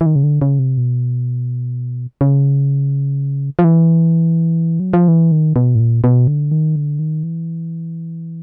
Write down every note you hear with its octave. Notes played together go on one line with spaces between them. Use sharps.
E3
D#3
C#3
D3
C#3
C3
B2
C#3
F3
E3
F#3
F3
E3
D#3
B2
A2
A#2
B2
D3
D#3
D3
D#3
E3